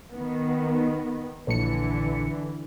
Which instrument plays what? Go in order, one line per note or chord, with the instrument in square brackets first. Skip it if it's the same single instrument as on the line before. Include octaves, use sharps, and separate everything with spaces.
[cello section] D#3 B3
[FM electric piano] A#1 A#2 C#7 [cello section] D3 E3